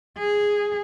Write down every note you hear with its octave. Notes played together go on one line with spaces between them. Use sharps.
G#4